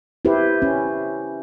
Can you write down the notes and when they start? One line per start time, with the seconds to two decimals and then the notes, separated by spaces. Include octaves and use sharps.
0.25 E4 G4 B4 C5
0.62 C#4